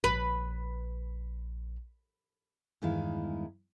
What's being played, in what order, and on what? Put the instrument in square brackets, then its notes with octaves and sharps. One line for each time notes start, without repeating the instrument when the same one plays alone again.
[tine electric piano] A#1 [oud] B4
[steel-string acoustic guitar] E2 G2 D#3 G#3 E4 F5